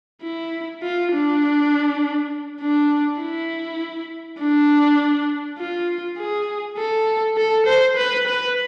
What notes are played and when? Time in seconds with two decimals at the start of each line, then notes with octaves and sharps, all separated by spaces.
0.23 E4
0.83 F4
1.13 D4
2.61 D4
3.21 E4
4.40 D4
5.59 F4
6.18 G#4
6.78 A4
7.37 A4
7.66 C5
7.97 B4
8.27 B4